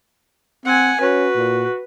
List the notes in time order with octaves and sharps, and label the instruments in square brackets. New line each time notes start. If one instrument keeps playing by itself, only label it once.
[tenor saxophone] C4 [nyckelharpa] F#5 G#5
[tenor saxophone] C#4 [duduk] F#4 [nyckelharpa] B4
[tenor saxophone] A#2